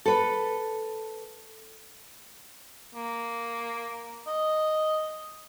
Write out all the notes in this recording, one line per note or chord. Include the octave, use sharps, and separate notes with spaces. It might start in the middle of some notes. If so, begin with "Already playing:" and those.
A4 B4
A#3
D#5